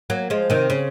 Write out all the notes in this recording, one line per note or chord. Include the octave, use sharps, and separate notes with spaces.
F#3 A#3
F3 G#3
C3 D#3
C#3